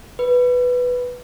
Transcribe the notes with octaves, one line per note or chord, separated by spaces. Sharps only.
B4